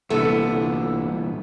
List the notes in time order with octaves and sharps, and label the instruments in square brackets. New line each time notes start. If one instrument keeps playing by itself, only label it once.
[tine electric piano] C2 D3 [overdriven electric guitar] A#2 E3 [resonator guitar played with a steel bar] A3 B3 A4